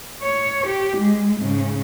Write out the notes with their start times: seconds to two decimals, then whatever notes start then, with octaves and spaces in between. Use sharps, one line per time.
0.23 C#5
0.67 G4
0.97 G#3
1.38 G#2 C#3